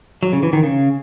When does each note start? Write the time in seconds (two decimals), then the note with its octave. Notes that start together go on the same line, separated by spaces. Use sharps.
0.23 F#3
0.33 C#3
0.43 E3
0.53 D#3
0.63 C#3